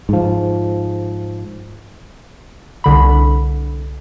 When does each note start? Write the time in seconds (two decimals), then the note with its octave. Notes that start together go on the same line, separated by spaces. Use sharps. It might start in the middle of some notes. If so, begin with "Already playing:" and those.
0.09 G#2 F3
2.84 C2 D3 B5